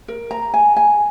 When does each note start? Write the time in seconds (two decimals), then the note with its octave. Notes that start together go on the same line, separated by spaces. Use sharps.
0.08 A#4
0.31 A#5
0.54 G#5
0.77 G#5